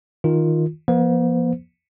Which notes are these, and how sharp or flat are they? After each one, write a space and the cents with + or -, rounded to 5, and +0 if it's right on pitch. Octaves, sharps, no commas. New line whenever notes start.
D#3 +10 F4 +0
F3 -20 A#3 +45 C5 -30